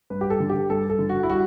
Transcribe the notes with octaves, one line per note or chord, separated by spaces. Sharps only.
G2 B4
G4
A4
D3
G4
G2 A4
A4
D3
F#4
E4
G3 F#4